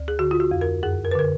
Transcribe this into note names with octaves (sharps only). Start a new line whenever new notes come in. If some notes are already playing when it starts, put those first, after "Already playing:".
Already playing: D2
G#4
D3 F#4
F4
F#4
F2
A#4
F#2 G#4
A#4
B4
D3 A#4